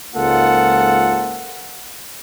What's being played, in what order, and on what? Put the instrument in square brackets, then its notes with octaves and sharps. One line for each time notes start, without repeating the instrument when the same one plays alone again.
[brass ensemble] C#2 G#2 A#3 F4 A4 F#5